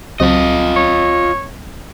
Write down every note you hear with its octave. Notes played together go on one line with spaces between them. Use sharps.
C#2 F#3 C4 F4 D#5
C#5